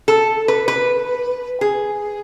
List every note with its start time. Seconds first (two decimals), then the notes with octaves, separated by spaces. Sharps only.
0.08 A4
0.48 B4
0.68 B4
1.61 G#4